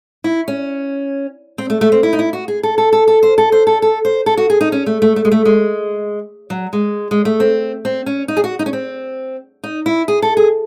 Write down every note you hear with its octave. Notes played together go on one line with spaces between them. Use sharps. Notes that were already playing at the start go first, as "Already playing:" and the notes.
E4
C#4
C4
A3
A3
C4
E4
D#4
E4
F#4
G#4
A4
A4
A4
A4
C5
A4
C5
A4
A4
C5
A4
F#4
G#4
D#4
C#4
A3
A3
A3
G#3
A3
G#3
F#3
G#3
G#3
A3
C4
C4
C#4
D#4
G#4
F#4
D#4
C#4
C4
D#4
E4
G#4
A4
G#4